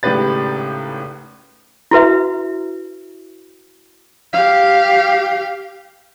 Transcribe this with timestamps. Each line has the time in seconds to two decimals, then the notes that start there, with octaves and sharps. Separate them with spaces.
0.03 G#1 A2 C#3 G4 B4 A6
1.91 E4 F#4 B4 E5
4.33 G4 F5